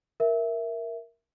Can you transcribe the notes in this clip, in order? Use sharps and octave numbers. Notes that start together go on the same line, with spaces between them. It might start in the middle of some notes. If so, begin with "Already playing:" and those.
A#4 E5